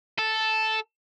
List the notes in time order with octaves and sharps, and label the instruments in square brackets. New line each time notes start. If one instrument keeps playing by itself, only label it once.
[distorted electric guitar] A4